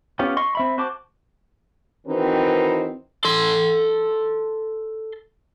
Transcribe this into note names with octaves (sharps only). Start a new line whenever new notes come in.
B3 C#4 F4 G4
D#5 C6 C#6
C4 E5 B5
F#4 C5 A5 D6
D#3 E3 C4 D#4 F#4 B4
A4 C6